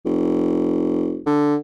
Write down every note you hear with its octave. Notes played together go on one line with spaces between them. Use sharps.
F1
D3